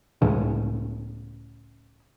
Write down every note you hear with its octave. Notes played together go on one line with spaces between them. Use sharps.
C#2 A2 C#3